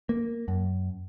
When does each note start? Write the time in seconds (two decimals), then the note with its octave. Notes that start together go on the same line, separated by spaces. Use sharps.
0.09 A#3
0.48 F#2